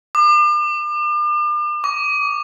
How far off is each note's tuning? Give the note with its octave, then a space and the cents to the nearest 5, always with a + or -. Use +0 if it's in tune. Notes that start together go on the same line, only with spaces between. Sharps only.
D6 +40
D6 -40